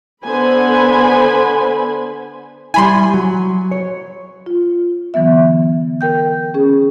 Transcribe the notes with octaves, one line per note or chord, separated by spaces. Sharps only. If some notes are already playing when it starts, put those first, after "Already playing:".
D3 B3 C5 G#5 B5
G3 E4 G#5 B5 C6
F#3
C#5
F4
D3 E3 F#3 B3 E5
A#4 G5 G6
C#4 G#4